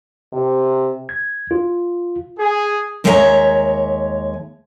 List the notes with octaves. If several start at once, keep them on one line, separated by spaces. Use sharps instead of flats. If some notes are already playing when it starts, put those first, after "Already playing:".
C3
G#6
F4
G#4
D#2 G#3 C#5 E5 F5 A#5